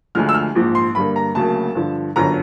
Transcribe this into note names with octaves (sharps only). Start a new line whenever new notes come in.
D2 D3 F3 G#3 F6
E6
F6
A#1 G#2 F3
C6
G2 D3 G3 A#3 B5
A#5
D2 C#3 F#3 A#3 A5
G2 D3 F3
G1 F#2 D3 F3 A#5